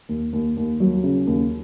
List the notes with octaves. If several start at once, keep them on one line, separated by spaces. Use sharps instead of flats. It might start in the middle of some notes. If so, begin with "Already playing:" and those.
D#2
D#2
D#2
F#3
C#3
D#2